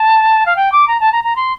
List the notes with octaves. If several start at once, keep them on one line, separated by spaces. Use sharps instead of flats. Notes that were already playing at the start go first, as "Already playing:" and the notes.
Already playing: A5
F5
G5
D6
A#5
A5
A#5
A#5
C6